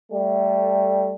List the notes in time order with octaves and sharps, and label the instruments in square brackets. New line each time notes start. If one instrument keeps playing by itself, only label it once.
[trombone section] G3 A3